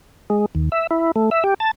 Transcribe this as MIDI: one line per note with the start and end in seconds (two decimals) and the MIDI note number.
0.30 0.46 56
0.55 0.69 39
0.72 0.87 76
0.91 1.11 64
1.16 1.30 57
1.31 1.44 76
1.44 1.54 67
1.60 1.71 81